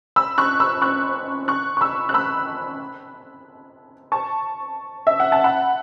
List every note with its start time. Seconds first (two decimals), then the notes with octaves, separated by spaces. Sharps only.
0.16 B5 E6
0.38 C#6 F#6
0.60 B5 E6
0.82 C#6 F#6
1.48 C#6 F#6
1.77 C#6
1.81 B5 E6
2.09 F#6
2.14 B5 E6
4.12 A5 C#6
5.07 E5
5.20 F#5
5.32 A5
5.44 F#5 B5